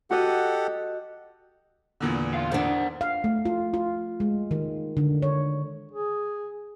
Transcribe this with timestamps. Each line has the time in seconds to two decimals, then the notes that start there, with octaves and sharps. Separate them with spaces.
0.11 F#4 G4 A4 D#5 F#5
2.00 E2 A#2 D3
2.34 F4 F5
2.52 D#3 D4 C5 F#5
3.01 F5
3.24 A3
3.45 F4
3.74 F4
4.20 G#3
4.51 D#3
4.97 D3
5.22 C#5
5.92 G#4